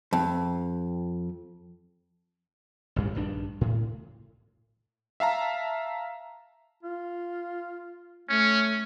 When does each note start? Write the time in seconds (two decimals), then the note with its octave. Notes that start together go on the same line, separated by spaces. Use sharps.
0.13 F2
2.96 A1 G2 G3
3.15 A#1 G2 D#3 D4
3.61 A2
5.20 E5 F5 A5 A#5
6.83 F4
8.29 A3 C#4